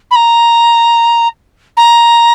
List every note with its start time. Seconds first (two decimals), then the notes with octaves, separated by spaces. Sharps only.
0.11 B5
0.15 A#5
1.77 A#5